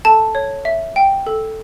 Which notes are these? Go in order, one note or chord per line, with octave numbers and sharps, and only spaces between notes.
A4 A5
C#5
E5
G5
A4